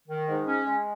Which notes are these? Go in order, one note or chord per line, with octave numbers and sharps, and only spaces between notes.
D#3
G#2
C#4
G#3